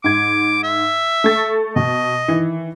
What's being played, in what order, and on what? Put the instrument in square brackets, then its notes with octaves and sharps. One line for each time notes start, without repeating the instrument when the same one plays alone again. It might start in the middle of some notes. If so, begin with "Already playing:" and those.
[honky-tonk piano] G#2 G#6 [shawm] D6
[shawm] E5
[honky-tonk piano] A3 A6
[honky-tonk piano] B2 [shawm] D#5
[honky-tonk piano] D#3 E3